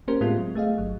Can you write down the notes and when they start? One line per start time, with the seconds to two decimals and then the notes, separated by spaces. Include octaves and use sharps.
0.08 A#3 C#4 G4 A#4 C5
0.21 A2 G#3 B3 C4 F4
0.38 F#3
0.55 A3 G#4 D#5 F5
0.78 G1 F#3